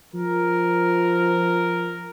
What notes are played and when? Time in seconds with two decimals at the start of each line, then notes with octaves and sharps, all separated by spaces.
0.14 F3 A#4